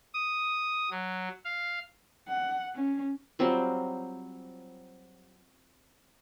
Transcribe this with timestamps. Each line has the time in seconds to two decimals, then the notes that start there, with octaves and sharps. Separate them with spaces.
0.14 D#6
0.90 F#3
1.45 F5
2.28 F#5
2.75 C#4
3.39 F#3 G3 C4 F4